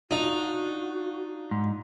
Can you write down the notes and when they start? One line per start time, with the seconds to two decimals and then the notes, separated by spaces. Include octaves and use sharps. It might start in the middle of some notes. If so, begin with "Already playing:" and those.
0.11 D4 D#4 F4 F#4 F7
1.51 G#2